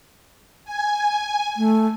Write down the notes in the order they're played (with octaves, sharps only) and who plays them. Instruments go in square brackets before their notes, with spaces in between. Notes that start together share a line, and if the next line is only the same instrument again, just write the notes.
[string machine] G#5
[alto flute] A3